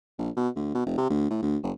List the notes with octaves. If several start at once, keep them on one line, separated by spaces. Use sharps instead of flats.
A#1
B2
D2
B2
F1
C3
D2
A2
D2
F#1